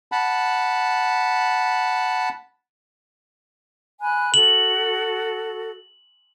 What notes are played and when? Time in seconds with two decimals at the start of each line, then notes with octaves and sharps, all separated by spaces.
0.12 F#5 A5 B5
4.01 G#5 B5 F#6
4.34 F#4 A4 F#7